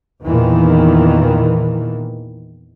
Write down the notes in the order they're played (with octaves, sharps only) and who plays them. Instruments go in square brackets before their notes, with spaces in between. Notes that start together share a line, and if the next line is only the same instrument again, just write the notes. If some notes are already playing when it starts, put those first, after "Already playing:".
[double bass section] E2 A#2 D#3 E3